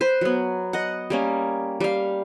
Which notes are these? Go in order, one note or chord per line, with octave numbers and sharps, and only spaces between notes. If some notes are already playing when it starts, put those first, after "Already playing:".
B4 C5
F#3 B3
D#5 F#5
G3 A#3 C#4
G3 F5